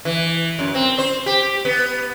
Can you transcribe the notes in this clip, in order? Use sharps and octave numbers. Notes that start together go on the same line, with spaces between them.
E3
F#2
C4
C5
G4
B3